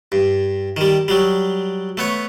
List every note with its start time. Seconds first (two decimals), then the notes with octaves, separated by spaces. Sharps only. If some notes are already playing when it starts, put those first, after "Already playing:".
0.12 G2
0.77 D#3 G3
1.08 F#3 G3
1.97 A3 B3 C#5